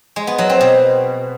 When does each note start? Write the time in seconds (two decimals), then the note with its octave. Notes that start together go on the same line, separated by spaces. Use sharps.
0.16 G#3
0.27 B3
0.38 F#3
0.49 C4
0.61 B2